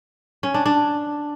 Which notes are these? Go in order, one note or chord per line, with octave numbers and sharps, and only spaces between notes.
C#4
D4
D4